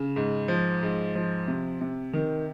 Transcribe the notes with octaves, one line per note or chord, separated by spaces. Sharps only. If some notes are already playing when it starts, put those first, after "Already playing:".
Already playing: C#3
G#2
F3
G#2
F3
C3
C3
D#3